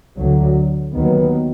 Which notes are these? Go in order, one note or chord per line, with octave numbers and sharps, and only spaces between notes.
D2 D3 F#3
D#2 D#3 F#3 B3